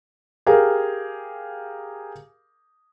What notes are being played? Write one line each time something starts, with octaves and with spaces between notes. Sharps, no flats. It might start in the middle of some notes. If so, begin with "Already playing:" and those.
G4 G#4 A#4 F5